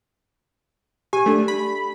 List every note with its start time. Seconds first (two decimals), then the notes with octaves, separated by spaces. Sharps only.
1.13 G4 G#5
1.26 A3 D4
1.48 B5